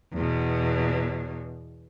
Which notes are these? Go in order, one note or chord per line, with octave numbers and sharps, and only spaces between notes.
E2 B2